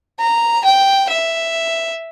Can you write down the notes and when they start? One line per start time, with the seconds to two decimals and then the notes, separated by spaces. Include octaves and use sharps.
0.19 A#5
0.64 G5
1.09 E5